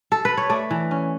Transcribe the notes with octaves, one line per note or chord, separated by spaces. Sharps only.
A4
B4
C#5
A3 D5
E3
C#4